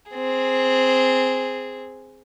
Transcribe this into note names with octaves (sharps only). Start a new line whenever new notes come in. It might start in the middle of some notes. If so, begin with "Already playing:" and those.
C4 G#4